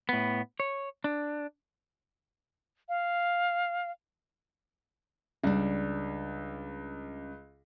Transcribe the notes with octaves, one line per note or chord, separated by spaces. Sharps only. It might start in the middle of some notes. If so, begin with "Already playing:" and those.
A2 B3
C#5
D4
F5
C#2 G3 D4